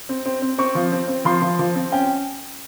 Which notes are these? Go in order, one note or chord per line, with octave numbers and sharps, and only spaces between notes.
C4
C4
C4
C4 C#6
F3
C4
C4
F3 C6
F3
F3
C4
C#4 G5